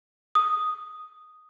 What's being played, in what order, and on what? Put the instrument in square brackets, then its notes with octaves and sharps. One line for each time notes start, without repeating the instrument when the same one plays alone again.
[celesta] D#6